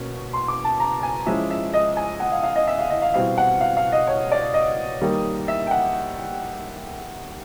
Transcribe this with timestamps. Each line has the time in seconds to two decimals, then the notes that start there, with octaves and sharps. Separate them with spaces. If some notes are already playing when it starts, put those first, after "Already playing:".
Already playing: B2 A#3 C#4
0.33 C6
0.48 D6
0.65 A5
0.80 A#5
1.03 G#5
1.26 F3 G#3 C#4 E4 E5
1.51 E5
1.74 D#5
1.97 G#5
2.20 F#5
2.32 F5
2.44 F5
2.56 D#5
2.67 E5
2.79 F5
2.90 D#5
3.02 F5
3.14 B2 G3 C4 E4 F5
3.38 F#5
3.61 F5
3.77 F5
3.92 D#5
4.07 C#5
4.32 D5
4.54 D#5
5.01 D#3 G3 A#3
5.48 E5
5.67 G5
5.71 F#5